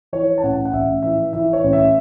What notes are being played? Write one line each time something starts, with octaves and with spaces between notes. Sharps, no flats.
E3 C#5
A5
A1 F#5
F#5
A1 E5
E3 E5
E3 E5
C#5
A1
E5